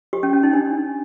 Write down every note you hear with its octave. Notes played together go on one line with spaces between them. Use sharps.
G4
C#4
C#4
D#4
D4